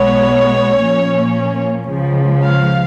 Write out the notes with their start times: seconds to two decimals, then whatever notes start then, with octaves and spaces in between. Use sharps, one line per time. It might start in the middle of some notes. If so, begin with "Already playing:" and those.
Already playing: B1 B2 G#3 B3 C#5
0.77 A#2 F3 A#3 C#4
1.87 C#2 C#3 F3
2.43 F5